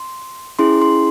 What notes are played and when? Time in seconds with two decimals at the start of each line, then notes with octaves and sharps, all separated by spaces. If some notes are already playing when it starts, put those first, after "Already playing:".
Already playing: C6
0.59 C#4 E4 G#4 C6
0.82 C6